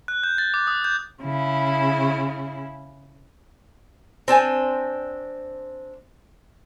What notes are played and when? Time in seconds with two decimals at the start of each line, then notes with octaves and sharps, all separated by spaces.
0.08 F#6
0.23 G6
0.38 A6
0.54 D6
0.67 D#6
0.84 G6
1.23 C#3 E4
4.28 C4 D4 G5 G#5